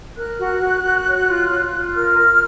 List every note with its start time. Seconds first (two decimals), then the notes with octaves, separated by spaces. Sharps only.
0.16 A#4 F#6
0.39 F#4
0.61 F#4
0.83 F#4
1.06 C#5
1.28 F4
1.50 F4
1.73 F4
1.94 A#4 F6
2.17 A#4